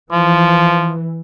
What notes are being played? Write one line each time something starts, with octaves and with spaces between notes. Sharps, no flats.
E3 F3